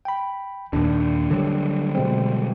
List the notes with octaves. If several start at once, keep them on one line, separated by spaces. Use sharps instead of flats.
G5 B5
D#2 A#2 D4
D3 F#3 G3
B2 G#3 C4